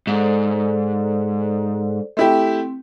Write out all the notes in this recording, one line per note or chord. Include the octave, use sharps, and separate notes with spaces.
G#2 A4 C5 D5
A3 C4 E4 G4